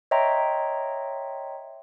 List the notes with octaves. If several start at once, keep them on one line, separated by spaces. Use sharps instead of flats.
C#5 D#5 E5 G5 A#5 C6